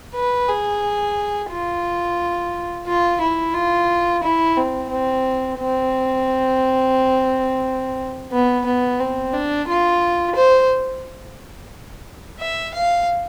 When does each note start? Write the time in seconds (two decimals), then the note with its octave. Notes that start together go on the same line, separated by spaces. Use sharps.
0.15 B4
0.49 G#4
1.50 F4
2.87 F4
3.21 E4
3.54 F4
4.23 E4
4.57 C4
4.90 C4
5.58 C4
8.32 B3
8.66 B3
9.00 C4
9.33 D4
9.68 F4
10.35 C5
12.40 E5
12.74 F5